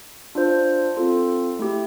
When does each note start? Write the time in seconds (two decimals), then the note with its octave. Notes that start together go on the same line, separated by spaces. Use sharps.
0.35 D4 F4 C5
0.97 C4 F4 A4
1.59 A3 E4 G4